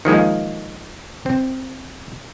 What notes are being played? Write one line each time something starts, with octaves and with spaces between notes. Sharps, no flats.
D#3 F3 G#3 A#3
C4